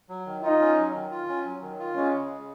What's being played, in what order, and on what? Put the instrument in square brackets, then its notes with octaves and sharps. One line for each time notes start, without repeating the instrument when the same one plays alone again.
[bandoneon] F#3
D#3
[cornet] D#4 [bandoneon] F4
[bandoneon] C#4
F#3
D#3
F4
C#4
F#3
D#3
F4
[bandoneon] G#3 [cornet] C#4
[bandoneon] C#3